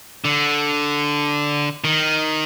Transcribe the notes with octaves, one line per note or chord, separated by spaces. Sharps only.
D3
D#3